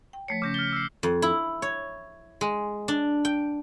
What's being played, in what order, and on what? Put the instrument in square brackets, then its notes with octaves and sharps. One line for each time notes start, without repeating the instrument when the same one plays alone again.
[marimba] G5
[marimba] F3 A3 C#5 [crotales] B6 C#7
[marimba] C#3 C#4 [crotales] D6 G6 A#6
[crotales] F6 G7 [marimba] A6
[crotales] E6 C7
[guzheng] F2
E4
C#5
G#3
D4
G5